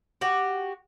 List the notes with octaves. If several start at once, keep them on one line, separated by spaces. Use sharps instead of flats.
F#4 G4